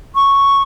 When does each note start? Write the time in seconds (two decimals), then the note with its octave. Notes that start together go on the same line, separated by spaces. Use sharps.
0.14 C#6